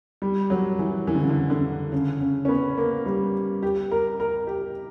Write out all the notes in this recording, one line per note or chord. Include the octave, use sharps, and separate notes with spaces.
G3
F#3
E3
E3
D3
C#3
D3
D3
C#3
C#3
C#4
B3
A#3
G3
G4
A#4
A#4
G4